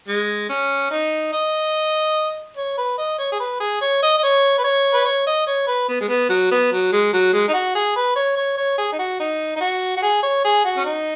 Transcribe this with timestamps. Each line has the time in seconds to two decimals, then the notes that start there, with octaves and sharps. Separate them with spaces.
0.08 G#3
0.49 C#4
0.91 D#4
1.33 D#5
2.57 C#5
2.78 B4
2.98 D#5
3.19 C#5
3.32 G#4
3.40 B4
3.60 G#4
3.82 C#5
4.03 D#5
4.18 D#5
4.23 C#5
4.58 B4
4.64 C#5
4.94 B4
5.05 C#5
5.27 D#5
5.47 C#5
5.67 B4
5.88 B3
6.01 G#3
6.09 B3
6.29 F#3
6.51 B3
6.72 F#3
6.93 G#3
7.13 F#3
7.33 G#3
7.48 D#4
7.54 F#4
7.75 G#4
7.96 B4
8.16 C#5
8.37 C#5
8.58 C#5
8.78 G#4
8.92 D#4
8.99 F#4
9.20 D#4
9.56 D#4
9.61 F#4
9.97 F#4
10.03 G#4
10.23 C#5
10.45 G#4
10.65 F#4
10.77 C#4
10.85 D#4